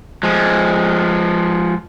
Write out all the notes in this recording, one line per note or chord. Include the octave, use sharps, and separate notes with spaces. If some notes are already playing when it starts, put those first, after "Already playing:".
F3 G#3